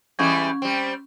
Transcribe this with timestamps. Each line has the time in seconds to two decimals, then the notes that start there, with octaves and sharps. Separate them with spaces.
0.19 E3 G3 G#3 C#4 C#6 G#6
0.62 G3 C4